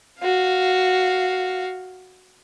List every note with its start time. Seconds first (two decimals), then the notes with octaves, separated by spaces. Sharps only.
0.20 F#4 F5